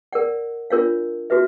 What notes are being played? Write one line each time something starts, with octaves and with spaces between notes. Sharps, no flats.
A#4 D5 F#5
D4 F4 A#4 C#5 F5
F#4 B4 E5